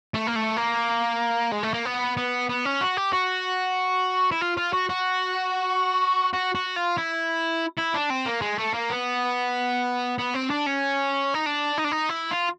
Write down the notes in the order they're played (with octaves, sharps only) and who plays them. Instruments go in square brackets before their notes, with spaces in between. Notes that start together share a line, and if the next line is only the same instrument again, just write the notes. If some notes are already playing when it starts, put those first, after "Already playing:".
[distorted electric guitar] A3
A#3
A3
A#3
G#3
A3
A#3
B3
B3
B3
C#4
F#4
G4
F#4
E4
F4
F4
F#4
F#4
F#4
F#4
F4
E4
E4
D4
C4
A#3
G#3
A3
A#3
B3
B3
C4
D4
C#4
D#4
D4
D#4
D4
D#4
E4
F4